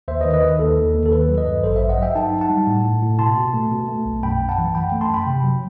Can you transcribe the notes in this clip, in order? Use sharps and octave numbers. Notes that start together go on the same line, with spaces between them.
D#2 C5 E5
B4 D#5
D#3
B4 D#5
D#3
D#2 A4
D#2
D#2
A4
D#3 B4
F#3
B4 D#5
G2
A1 A4 C5
G2 C5 E5
D#5 F#5
F#3 E5 G5
D#4 F#5 A5
D#4
F#5 A5
G3
A2
A2
A2
B2 A5 C6
B2
A3
B2
A3
B1
F#2 G5 B5
F#2
F#5 A5
E3
F#2 G5 B5
A3
A5 C6
F#2 G5 B5
C3
F#3